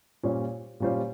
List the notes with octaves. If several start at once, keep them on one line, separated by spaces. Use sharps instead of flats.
A#2 G3 C#4 F4 C5
A#2 G3 C#4 F4 C5